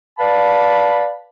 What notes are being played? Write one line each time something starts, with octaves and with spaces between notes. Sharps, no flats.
B4 D5 F5 A5 B5